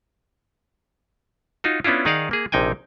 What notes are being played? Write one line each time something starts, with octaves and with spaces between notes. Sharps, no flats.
D#4 F4 F#4
B3 C#4 D4 E4 F4
D#3 D#4 G#4 D5 F5 F#5
A#3 G#4
A#1 C3 D#4 G5 G#5